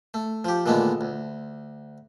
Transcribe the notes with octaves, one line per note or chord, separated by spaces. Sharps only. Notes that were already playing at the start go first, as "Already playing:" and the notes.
A3
F3 G4
A#2 D3 D#3 G#3 A3 B3
D2